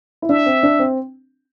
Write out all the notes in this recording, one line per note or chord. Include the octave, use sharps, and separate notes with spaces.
E4
D4 E5
C4
D4
C4